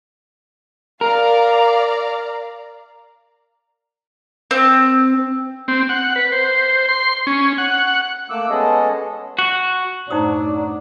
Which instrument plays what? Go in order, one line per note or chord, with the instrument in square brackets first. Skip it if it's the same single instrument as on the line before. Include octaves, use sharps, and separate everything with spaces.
[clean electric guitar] A#4 [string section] D5 F5 A#5
[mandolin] C4
[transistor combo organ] C4
F#5
B4
C5
C6
C#4
F#5
[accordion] A3 A#3 D6 E6
G#3 B3 C#4 G#4 A4 D#5
[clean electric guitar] F#4
[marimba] F#2 A2 A3 [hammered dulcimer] F#3 [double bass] D4 [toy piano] D#4 C5 D#6